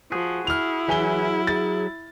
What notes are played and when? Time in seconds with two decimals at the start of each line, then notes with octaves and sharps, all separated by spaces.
0.12 F3 F#4 G#4
0.47 E4 F6 F7
0.88 E3 F#3 G#4 E5 G#5 G7
1.47 G#4 A6